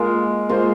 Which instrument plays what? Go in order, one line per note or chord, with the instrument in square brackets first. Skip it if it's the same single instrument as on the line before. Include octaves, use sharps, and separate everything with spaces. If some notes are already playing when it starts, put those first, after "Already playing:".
Already playing: [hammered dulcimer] G#3 [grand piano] A#3 F4 A#4
[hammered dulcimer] G#3 [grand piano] A#3 F4 C5